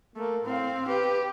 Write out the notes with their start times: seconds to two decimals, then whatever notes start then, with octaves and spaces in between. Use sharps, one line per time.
0.16 A3 A#3
0.44 A2 C4 F5
0.88 G4 B4